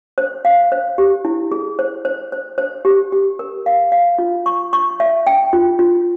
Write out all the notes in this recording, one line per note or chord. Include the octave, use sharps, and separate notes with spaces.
C5
F5
C5
G4
E4
G#4
C5
C5
C5
C5
G4
G4
A#4
F5
F5
F4
C#6
C#6
E5
G5
F4
F4